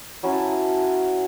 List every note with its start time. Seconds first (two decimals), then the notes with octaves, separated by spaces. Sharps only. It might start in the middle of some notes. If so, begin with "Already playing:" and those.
0.23 F#3 C#4 E4 G#5
0.32 A5
0.40 G#5
0.53 A5
0.83 G#5